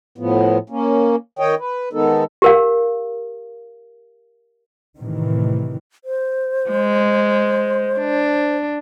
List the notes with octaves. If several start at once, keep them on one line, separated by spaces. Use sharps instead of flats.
A2 F3 B3
A#3 C#4
D#3 C#5 D#5 G5
B4
D#3 G#3 B3 D#4 A4
G4 A#4 F5
A2 C3 D#3 E3
C5
G#3
D4